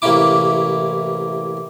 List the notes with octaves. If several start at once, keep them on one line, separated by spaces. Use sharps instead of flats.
A1 C3 A#3 C#4 E4 D6